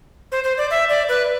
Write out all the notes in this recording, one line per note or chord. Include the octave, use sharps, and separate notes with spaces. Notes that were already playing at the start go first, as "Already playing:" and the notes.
C5
C5
D5
E5
D5
B4